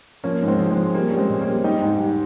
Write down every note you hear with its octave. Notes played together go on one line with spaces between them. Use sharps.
F3 A#3 C#4
G#2
G#3 C4
F3
G#3 C4
F3
G3 A#3
G3 C#4
G#3 C4
A#2
A#3 C#4
G3
G3 D#4 G4
G#2
G3